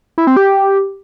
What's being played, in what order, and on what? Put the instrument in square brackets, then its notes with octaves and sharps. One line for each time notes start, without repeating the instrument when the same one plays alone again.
[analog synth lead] E4
C4
G4